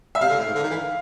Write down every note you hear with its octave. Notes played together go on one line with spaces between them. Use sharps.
E5
C3 F5
D3
A2
G#2
D3
D#3
E3